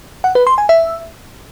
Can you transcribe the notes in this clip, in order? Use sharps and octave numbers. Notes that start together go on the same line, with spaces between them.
F#5
B4
C6
G#5
E5